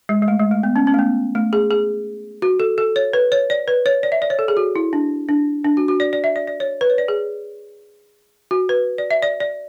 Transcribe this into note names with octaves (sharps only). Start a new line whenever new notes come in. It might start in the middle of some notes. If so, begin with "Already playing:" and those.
G#3
G#3
A3
G#3
A3
B3
C#4
C#4
A3
B3
A3
G#4
G#4
F#4
A4
A4
C#5
B4
C#5
D5
B4
C#5
D5
E5
D5
C#5
A4
G#4
F#4
E4
D4
D4
D4
F#4
F#4
D5
D5
E5
D5
D5
C#5
B4
C#5
D5
G#4
F#4
B4
D5
E5
D5
D5